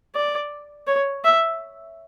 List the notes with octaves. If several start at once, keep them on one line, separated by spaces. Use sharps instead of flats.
D5
C#5
E5